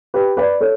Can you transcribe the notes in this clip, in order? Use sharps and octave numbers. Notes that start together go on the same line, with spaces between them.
G4 B4
B4 D5
A4 C#5